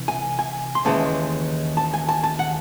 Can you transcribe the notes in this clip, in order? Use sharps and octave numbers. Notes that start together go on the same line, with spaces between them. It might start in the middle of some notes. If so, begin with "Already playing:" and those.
Already playing: C3 E3
G#5
G#5
C6
D#2 C#3 E3 G#3 A5
A5
G#5
A5
A5
F#5